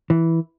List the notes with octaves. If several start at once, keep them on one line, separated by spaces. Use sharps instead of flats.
E3